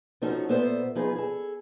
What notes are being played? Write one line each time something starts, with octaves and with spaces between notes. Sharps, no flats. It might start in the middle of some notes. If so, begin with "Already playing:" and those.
F3 C#4 D#4 F#4 A4
A#2 B3 A4 C5 E5
F3 B3 D#4 G#4 B4
G#4 A4